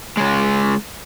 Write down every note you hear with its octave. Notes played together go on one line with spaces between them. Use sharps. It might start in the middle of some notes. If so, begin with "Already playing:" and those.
C#3 G#3